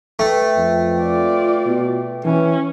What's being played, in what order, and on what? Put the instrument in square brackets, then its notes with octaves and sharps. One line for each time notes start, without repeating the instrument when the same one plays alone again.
[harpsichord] A3 [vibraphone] B4 G5
[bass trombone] F2
[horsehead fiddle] F4 D5
[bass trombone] B2
[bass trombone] E3 [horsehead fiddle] C#4